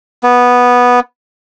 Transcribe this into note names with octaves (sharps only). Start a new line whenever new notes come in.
B3